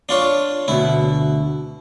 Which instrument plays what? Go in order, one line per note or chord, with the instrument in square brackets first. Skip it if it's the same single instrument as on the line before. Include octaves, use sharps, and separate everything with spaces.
[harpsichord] D4 F4 C#5
[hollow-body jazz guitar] D2 B2 [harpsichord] E4